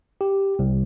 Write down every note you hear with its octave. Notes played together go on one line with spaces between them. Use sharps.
G4
C2